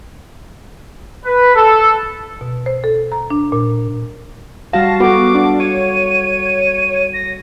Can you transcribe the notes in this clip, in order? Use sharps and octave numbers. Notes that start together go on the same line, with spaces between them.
B4
A4
B2
C5
A4
A#5
D4
A#2
G3 F#4 F5 A5 A#6
B3 F#4 A4 D6
D4
C#5 D#7
A#6